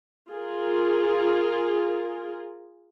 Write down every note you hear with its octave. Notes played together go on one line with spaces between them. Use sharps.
F4 G#4 A#4